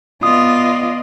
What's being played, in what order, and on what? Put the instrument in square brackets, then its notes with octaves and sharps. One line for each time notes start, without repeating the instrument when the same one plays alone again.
[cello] B3 F4 [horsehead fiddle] D5 D#5 [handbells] D#6